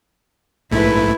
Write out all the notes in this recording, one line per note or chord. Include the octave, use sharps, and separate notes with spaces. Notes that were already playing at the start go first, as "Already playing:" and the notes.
A#1 G#2 A3 E4 B4